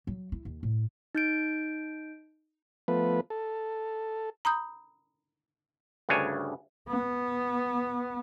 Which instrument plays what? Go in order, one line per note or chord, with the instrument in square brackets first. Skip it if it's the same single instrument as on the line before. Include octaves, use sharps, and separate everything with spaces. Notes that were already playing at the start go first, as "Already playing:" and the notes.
[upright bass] F#3
E4
D#2
A2
[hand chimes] D#4 G6 D7
[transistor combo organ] F3 A3 B3 B4
A4
[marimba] A#5 B5 D#6 G6
[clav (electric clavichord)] D2 G2 C#3 D4 C#5 G#5
[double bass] B3